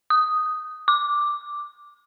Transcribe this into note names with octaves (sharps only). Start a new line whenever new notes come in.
D#6
D6